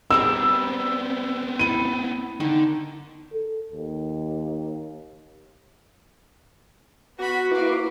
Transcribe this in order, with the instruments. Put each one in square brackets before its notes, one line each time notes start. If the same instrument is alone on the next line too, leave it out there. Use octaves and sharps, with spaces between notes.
[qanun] G3 G#4 A#4 [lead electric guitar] B3 C4 [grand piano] E6
[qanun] E4 A4 [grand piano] D#7
[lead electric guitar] D3 [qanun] D#3
[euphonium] A4
D#2
[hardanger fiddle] B3 B5 [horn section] F#4
[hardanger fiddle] A#3 F5 [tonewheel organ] E4 B4 D6